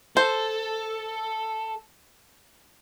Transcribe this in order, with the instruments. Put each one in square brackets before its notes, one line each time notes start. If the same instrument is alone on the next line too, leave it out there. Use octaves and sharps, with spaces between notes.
[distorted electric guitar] A4 [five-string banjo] C5